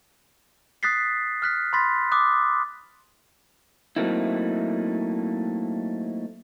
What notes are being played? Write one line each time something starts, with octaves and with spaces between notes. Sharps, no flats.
D#6 F#6 A6 B6 C7
F6 F#6 B6
B5 C6 A6 B6
D6 D#6 F#6
F#3 A3 A#3 C4 D#4 E4